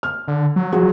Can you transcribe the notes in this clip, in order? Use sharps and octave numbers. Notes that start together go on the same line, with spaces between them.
F6
D3
F#3
F3 F#4 G#4